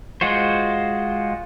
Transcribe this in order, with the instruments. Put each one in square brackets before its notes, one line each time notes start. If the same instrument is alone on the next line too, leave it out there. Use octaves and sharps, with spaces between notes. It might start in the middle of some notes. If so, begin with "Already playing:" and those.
[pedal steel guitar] G#3 F4 F#4 C5